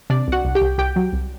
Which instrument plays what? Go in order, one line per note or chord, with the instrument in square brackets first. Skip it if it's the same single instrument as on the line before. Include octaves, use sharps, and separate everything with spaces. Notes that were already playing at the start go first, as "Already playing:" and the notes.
[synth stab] C3 D4 D5
C2 F#4 F#5
C2
G4 G5
C2
C2 G4 G5
F#3
C2